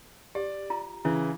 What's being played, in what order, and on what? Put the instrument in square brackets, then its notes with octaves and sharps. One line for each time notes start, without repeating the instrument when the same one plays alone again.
[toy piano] G4 [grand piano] D5
[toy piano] F4 A#5
[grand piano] C#3 E3 [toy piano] E4